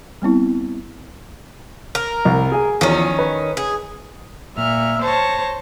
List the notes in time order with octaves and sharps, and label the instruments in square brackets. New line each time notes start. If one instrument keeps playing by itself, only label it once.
[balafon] G3 B3 C4 E4
[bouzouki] A#4
[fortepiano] C2
G#4 G#5
[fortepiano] E2 F3 [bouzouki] D#3 C#4
[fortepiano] B4
[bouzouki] G#4
[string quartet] A#2 E5 F6
C5 C#5 A5 A#6